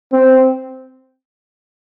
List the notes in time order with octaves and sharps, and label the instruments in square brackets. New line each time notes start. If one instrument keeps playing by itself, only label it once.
[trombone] C4